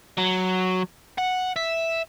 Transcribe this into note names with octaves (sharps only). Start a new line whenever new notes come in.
F#3
F#5
E5